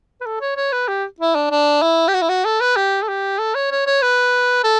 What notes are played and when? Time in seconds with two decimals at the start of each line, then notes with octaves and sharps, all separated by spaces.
0.21 B4
0.26 A4
0.41 C#5
0.57 C#5
0.72 B4
0.88 G4
1.20 E4
1.35 D4
1.51 D4
1.82 E4
2.08 G4
2.14 F#4
2.22 E4
2.29 F#4
2.45 A4
2.61 B4
2.76 G4
3.03 A4
3.08 G4
3.39 A4
3.55 C#5
3.71 C#5
3.87 C#5
4.02 B4
4.64 A4